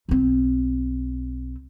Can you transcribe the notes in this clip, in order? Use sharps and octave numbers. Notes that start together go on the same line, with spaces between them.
B1 C4